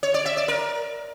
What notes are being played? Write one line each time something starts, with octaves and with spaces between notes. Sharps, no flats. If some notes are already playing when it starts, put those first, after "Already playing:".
C#5
D5
E5
D5
A#4